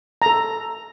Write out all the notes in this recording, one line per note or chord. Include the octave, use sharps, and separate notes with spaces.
A4 A#5